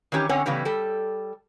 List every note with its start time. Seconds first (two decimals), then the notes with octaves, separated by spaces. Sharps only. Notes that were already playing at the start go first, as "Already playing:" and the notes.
0.12 D#3 E3 C#4 G4
0.29 D3 C4 C#4 C#5 F#5 G#5
0.46 A2 C#3 E3 G3 B3
0.65 G3 A4